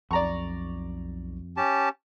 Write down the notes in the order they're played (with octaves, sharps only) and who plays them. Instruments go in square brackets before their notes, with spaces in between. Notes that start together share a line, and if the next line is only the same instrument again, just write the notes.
[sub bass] B1 [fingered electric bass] F2 [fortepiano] D5 A#5 C#6
[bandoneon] C#4 G4 A5